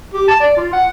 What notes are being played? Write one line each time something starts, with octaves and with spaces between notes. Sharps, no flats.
G4
A5
D5
F4
F#5